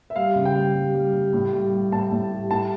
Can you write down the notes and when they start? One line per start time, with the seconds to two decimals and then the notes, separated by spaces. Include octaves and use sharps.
0.10 E5
0.16 G3 F5
0.36 C#3
0.45 G5
0.55 G3
0.75 G3
0.94 G3
1.13 G3
1.33 A2
1.53 G3
1.73 G3
1.92 A2 A5
2.11 A2
2.31 G3
2.50 A2 A5